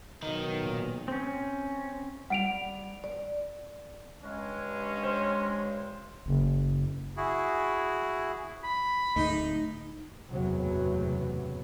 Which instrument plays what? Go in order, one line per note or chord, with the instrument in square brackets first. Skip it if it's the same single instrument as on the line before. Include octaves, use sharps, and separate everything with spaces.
[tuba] B1 [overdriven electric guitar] D#3 D#4
[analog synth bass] A#2
[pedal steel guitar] C4 C#4
[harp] G3 [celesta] F#5 D7 F7
[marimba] D5
[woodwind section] G2 G#3 [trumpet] C#4
[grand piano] C5 [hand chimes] C#5 C6
[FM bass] F#1
[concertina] E4 F#4 G#4
[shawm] B5
[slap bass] D1 A3 [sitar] D#4
[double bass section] F#1 E2 A2 C3 F#3 B3